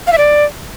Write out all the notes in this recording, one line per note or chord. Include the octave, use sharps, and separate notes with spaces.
F5
E5
D5